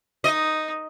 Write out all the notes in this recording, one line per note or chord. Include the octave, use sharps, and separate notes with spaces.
D#4 D#5